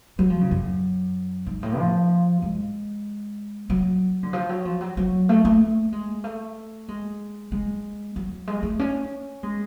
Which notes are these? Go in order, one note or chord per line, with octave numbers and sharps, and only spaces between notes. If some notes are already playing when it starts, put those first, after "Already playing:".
F#3
F3
C#3
F#2
G#2
A2
F3
G#3
F#3
D3
F3
F#3
F3
F#3
F#3
A3
A3
G#3
A3
G#3
G#3
F#3
G#3
A3
C#4
G#3